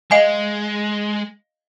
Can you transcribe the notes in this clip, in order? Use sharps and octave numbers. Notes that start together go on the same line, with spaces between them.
G#3 D#5 F5 G#5